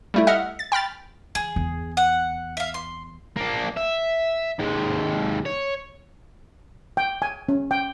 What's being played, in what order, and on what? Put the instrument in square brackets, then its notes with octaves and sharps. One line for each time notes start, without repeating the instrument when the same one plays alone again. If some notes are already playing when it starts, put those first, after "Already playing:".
[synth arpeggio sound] G3 A3 E4
D#5 E5 F#5 F6
A6
G5 B5 F6 A6
[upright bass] E3 [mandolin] G#4
[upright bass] E2
[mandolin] F#5
E5 F5
C6
[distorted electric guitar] A#3 D4
E5
D#2 G#3
C#5
[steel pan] G5
G#5
C#4
G5